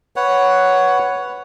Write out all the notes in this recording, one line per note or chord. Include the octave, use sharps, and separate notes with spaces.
B4 C#5 F#5